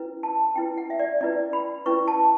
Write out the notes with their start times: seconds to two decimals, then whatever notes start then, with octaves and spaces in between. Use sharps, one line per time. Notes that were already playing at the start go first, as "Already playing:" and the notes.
Already playing: C#4 E4 B4
0.23 A5
0.55 C#4 E4 B4 G5
0.77 F#5
0.90 E5
0.99 D5
1.21 C#4 E4 B4 D5
1.53 B5
1.86 C#4 E4 B4 C#6
2.08 A5